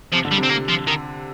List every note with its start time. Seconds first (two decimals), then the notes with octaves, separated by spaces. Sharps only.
0.13 C3 F3
0.25 D3
0.32 G3
0.37 C3
0.44 C4
0.50 C3 A#3
0.69 F3
0.87 D#3